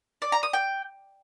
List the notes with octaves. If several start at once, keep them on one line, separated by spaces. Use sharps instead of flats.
D5
A#5
D#6
G5